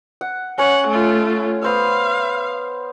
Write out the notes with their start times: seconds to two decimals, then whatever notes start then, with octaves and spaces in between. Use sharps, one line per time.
0.21 F#5
0.58 C#4 C#5 F#5
0.88 A3 F4
1.62 B3 C5 F5 E6